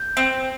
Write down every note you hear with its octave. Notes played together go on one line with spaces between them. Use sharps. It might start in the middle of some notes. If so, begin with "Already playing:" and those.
Already playing: G6
C4